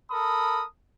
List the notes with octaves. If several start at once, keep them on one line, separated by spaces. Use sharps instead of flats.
A4 A#4 B5 D#6